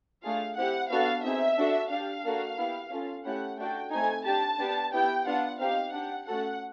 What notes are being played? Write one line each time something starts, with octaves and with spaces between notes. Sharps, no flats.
A3 D4 F4 G#4 F5
C4 E4 G4 F#5
B3 D4 F#4 A4 F5
C4 D#4 G#4 E5
D4 F#4 A4
D4 G4 F5
A#3 D4 F#4 A4
B3 E4 G4
C#4 F4 A4
A3 C#4 E4 G4 F#5
A3 D4 F#4 A4 G5
A3 C4 D#4 G#5
D4 G4 A5
B3 D4 G4
B3 E4 G4 G5
B3 D4 F4 F#5
C4 D#4 G4 F5
D4 G4 F#5
A3 C#4 F#4 A4 F#5